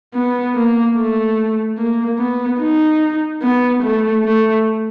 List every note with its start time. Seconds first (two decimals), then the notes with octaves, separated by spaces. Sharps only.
0.15 B3
0.55 A#3
0.96 A3
1.78 A#3
2.19 B3
2.60 D#4
3.43 B3
3.83 A3
4.25 A3